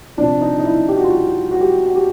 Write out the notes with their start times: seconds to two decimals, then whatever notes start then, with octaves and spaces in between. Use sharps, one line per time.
0.17 C3 F3 D4
0.41 D#4
0.58 D#4
0.65 E4
0.89 G4
0.96 F#4
1.04 F4
1.10 F#4
1.51 F#4
1.61 G4
1.86 F#4
1.96 G4